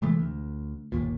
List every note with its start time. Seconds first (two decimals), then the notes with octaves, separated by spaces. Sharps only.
0.02 C3 E3 G#3 A3
0.19 D2
0.92 G1 D#2 A#2